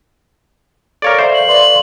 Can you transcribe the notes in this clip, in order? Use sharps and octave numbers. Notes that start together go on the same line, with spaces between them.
A4 A#4 C#5 D5 F5 C#6
C5 D5 E5
F#7
B4 D5 C6